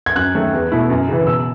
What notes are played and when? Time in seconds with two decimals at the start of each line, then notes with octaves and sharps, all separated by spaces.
0.06 G#6
0.15 F#2 F#6
0.35 D#3 F#3 A3
0.53 E2
0.72 B2 A3 E4
0.90 F#2
1.09 C#3 E3
1.27 B2 E6